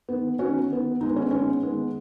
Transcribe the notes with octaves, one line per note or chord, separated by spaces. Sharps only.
D#3 B3
D#3 B3 C#4 F#4
D#3 B3
D#3 G#3 B3 D#4
C#4
D#3 G#3 B3 C#4
D#3 G#3 B3